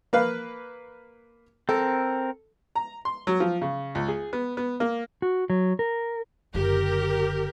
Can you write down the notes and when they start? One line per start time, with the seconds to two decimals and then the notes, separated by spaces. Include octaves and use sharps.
0.13 A#3 B4 F5
1.69 C4 A4 A#4
2.75 A#5
3.05 C6
3.27 F#3
3.40 F3
3.62 C#3
3.95 C#2
4.08 G#4
4.33 B3
4.57 B3
4.80 A#3
5.22 F#4
5.50 F#3
5.79 A#4
6.54 F#1 D3 G4 A#4